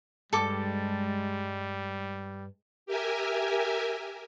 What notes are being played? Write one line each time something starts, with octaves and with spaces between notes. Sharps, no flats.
G2 G3 G#3 A4 A5 D6
G4 A#4 E5 G#5